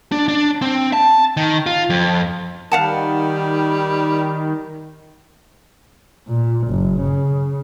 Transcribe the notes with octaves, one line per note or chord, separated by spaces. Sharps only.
D4
D4
C4
A5
D#3
F4
F2
D#3 G3 F5 F#5 A5
A#2
F#1
C#3